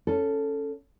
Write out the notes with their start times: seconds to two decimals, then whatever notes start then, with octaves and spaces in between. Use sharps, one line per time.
0.07 C#4 A4